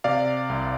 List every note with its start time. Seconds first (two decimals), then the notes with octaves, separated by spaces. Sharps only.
0.04 C3 D5 F5
0.50 C2